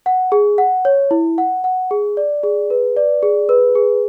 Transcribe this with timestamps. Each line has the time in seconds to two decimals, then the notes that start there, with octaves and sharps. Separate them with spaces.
0.06 F#5
0.32 G#4
0.58 F#5
0.85 C#5
1.11 E4
1.38 F#5
1.64 F#5
1.91 G#4
2.17 D5
2.44 G#4
2.70 B4
2.97 D5
3.23 G#4
3.49 B4
3.75 G#4